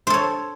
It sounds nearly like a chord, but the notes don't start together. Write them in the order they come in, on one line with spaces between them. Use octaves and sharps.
C5 A4 C#5